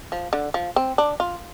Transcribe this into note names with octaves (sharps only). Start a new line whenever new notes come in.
F3
D3
F3
C4
D4
F4